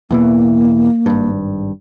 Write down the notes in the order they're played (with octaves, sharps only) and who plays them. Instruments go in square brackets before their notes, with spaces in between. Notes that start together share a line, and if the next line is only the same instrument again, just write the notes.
[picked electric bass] E2 B2 E3 [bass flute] A#3
[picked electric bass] G#1 G2